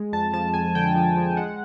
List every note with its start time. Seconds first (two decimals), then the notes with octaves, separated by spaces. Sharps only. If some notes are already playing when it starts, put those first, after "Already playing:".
Already playing: G#3
0.13 F2 A5
0.33 F3 A5
0.54 F2 G#5
0.75 D3 G5
0.95 F3
1.17 F3
1.37 G#3 F#5